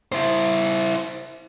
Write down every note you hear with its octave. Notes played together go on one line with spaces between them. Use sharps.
E4 C5